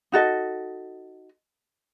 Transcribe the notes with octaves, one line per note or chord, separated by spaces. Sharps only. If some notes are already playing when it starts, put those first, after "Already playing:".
D#4 F#4 A4 D#5